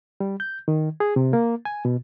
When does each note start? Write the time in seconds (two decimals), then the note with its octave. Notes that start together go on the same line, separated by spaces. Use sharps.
0.20 G3
0.40 G6
0.68 D#3
1.00 G#4
1.16 C3
1.33 A#3
1.65 G#5
1.85 B2